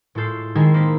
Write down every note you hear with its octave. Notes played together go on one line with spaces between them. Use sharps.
A2 G#3 F4 A4 G6 C7
D#3 G#3 C4 D#4 E4 G#4
A#3 C5 B6